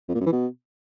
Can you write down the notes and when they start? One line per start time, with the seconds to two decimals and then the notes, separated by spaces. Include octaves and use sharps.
0.09 F2
0.15 A#2
0.21 F#2
0.26 E3
0.32 B2